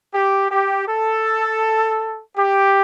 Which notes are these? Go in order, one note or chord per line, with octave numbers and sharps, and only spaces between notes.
G4
G4
A4
G4